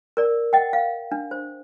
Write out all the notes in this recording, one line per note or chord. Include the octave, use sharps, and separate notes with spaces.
A#4 D5
D#5 F#5 G5
F5
D4
C5